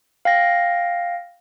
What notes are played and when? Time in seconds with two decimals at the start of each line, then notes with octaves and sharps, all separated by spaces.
0.25 F5 G5 A#6